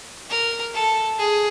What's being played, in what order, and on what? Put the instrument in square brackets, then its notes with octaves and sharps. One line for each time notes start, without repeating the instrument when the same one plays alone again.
[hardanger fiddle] A#4
A4
G#4